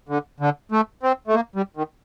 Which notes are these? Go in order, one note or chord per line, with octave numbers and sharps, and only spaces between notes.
D3
D3
A3
C4
A3
A#3
G3
D#3